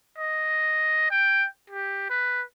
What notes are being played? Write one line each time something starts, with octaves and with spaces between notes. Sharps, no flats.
D#5
G5
G4
B4